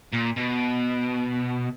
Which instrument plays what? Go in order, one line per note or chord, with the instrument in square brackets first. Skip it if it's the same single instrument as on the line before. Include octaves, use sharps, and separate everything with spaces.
[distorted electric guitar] A#2
B2